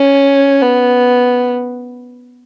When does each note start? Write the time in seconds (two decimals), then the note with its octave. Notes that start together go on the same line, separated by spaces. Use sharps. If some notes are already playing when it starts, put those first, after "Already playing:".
Already playing: C#4
0.62 B3